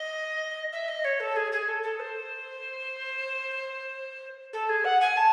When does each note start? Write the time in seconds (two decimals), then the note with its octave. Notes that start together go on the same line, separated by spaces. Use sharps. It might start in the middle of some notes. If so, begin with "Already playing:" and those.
Already playing: D#5
0.72 E5
0.88 D#5
1.04 C#5
1.20 A4
1.36 G#4
1.52 G#4
1.67 A4
1.83 A4
1.99 C5
4.53 A4
4.69 G#4
4.84 F#5
5.00 G#5
5.16 A5